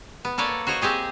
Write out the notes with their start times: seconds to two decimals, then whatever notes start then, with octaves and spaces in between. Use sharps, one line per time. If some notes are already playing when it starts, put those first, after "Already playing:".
0.25 B3
0.38 A#3 A4 B4 C#5 D5
0.67 F#4 C5 C#5 D#5
0.81 C4 G4 G#4 D#5